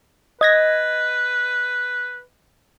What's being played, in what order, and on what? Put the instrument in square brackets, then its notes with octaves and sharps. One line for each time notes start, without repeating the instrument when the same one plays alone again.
[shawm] B4 [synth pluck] D#5 G#6 A#6